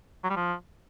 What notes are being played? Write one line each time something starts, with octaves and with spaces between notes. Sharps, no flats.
F#3
G3
F3